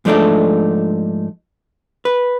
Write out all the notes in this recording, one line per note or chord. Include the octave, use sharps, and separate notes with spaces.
G#2 F3 A3 D4 D#4 A4
B4